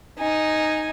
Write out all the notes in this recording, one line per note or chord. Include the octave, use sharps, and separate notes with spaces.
D#4 G#5